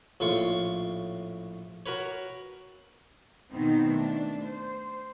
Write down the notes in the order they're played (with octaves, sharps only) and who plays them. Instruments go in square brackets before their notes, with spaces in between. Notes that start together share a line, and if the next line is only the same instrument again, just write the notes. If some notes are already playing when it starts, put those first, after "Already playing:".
[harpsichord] A#1 A2 F4 C#6
F#4 A#4 B4 C#5
[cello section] B2 D#3 B3 C4 D#4
A3 D4
C5